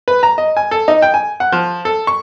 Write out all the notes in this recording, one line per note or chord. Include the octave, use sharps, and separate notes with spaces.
B4
A#5
D#5
G#5
A4
D#4
G5
G#5
F#5
F3
A4
C#6